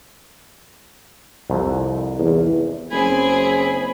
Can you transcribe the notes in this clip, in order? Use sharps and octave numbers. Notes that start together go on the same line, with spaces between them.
C2 F2
E2
F#1 C4 G#4 G#5 B5